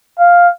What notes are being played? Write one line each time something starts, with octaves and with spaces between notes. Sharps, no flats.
F5